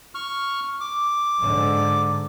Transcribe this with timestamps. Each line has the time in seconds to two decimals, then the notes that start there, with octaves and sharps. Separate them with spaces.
0.15 C#6 F6
0.80 D6
1.38 G#2 D3